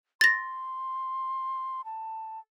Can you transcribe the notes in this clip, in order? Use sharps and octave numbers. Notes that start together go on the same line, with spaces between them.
C6 A6 A#6
A5